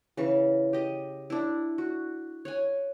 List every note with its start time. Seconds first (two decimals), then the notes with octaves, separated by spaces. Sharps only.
0.17 C#3 E3 C#6
0.73 G4 D#5
1.30 D4 E4
1.78 F#4
2.45 C#5 F#5 G#5